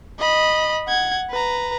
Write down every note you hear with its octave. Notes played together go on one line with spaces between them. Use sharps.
D#5 B5
F#5 G#6
B4 A#5